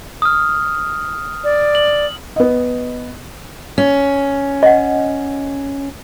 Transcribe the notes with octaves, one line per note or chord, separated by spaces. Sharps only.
D#6 F6
D5
F#7
B3 D#5
C#4
D#5 F#5